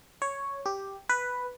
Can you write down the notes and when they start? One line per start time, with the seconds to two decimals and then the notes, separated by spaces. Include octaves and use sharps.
0.22 C#5
0.66 G4
1.09 B4